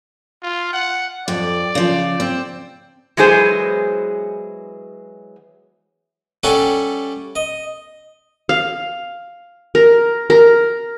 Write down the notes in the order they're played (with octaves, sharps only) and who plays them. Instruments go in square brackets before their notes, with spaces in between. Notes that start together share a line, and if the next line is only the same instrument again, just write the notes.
[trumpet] F4
F#5
[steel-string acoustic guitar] F2 [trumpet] D5
[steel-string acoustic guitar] C#3 F3
C4
[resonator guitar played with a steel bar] E3 F#3 G#3 B3 G#4 C5
[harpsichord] G3 C#4 A4 E5 F#5
D#5
[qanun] F5
A#4
A#4